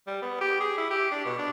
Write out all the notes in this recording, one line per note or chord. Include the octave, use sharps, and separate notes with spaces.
G3
B3
G4
G#4
E4
G4
D4
B2
D4